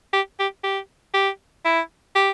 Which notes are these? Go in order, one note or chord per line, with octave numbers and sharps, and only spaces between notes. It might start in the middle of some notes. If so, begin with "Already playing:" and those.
G4
G4
G4
G4
E4
G4